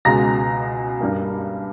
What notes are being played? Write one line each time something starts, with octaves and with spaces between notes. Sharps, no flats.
C#2 B2 G#3 A#5 A#6
G2 G3 A#3